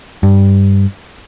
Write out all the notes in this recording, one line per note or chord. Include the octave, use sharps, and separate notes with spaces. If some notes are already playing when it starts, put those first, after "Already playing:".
G2